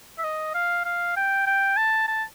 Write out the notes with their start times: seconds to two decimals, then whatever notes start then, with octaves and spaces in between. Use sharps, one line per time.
0.18 E5
0.24 D#5
0.54 F5
0.85 F5
1.16 G5
1.46 G5
1.77 A5
2.08 A5